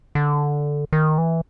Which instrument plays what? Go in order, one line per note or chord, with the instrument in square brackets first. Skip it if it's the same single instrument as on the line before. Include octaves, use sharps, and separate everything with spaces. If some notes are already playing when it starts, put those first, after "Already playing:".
[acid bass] D3
D#3
E3